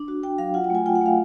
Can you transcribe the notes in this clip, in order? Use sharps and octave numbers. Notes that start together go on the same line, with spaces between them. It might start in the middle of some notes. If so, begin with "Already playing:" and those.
Already playing: D4
F#4
F#4 G5
F#3 F5
F4 F#5
G5
A3 G#5
F4 G5
F#5
A3 F5